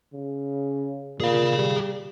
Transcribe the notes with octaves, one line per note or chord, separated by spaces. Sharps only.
C#3
A#2 G#4 F5
G3